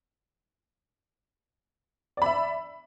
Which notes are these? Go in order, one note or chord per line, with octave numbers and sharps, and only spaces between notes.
D5 E5 B5